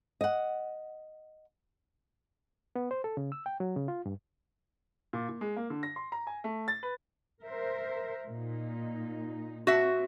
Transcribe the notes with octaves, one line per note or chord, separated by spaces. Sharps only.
D#5 F#5
B3
C5
A4
C#3
E6
G5
F#3
C#3
F4
G2
A#2
A#2
G#3
A#3
D3
A#6
C6
A#5
G#5
A3
A6
B4
A#4 C5 E5
A#2 D#4
C4 F#4 E5